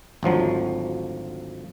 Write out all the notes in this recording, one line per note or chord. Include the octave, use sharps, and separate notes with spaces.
G#1 D2 F3 F#3